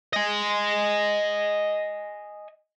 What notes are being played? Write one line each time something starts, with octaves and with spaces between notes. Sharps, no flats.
D#5 G#5